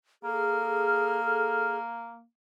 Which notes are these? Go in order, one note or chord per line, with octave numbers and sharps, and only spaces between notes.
A#3 G#4 A4 F6